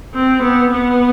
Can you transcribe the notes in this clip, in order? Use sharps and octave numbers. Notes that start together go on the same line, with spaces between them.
C4
B3
B3